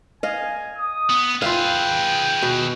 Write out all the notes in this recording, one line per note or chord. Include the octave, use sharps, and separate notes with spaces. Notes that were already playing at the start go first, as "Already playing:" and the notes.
D#5 F5 G#5
D#6
B3
F4 G#4 B4 E5 F5 G5
B2